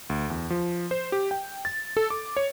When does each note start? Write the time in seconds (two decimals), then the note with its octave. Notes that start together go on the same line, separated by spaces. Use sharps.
0.10 D2
0.30 E2
0.50 F3
0.91 C5
1.12 G4
1.31 G5
1.65 A6
1.97 A4
2.10 D6
2.36 C#5